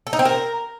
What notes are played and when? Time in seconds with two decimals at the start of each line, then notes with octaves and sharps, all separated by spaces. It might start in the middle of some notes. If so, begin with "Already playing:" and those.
0.07 A4
0.13 D#4
0.19 C4
0.25 A#4